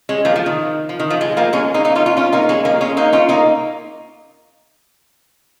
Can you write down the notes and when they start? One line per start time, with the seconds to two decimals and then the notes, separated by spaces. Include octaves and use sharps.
0.09 G#3 C#4
0.25 F3 A#3
0.36 F3
0.46 D#3
0.89 F3
1.00 D#3
1.10 F3
1.21 G#3
1.37 F3 A#3
1.53 G#3 C#4
1.74 A#3 D#4
1.85 A#3 D#4
1.95 C#4 F4
2.06 C#4 F4
2.17 C#4 F4
2.33 A#3 D#4
2.49 G#3 C#4
2.65 F3 A#3
2.81 G#3 C#4
2.97 A#3 D#4
3.13 C#4 F4
3.29 A#3 D#4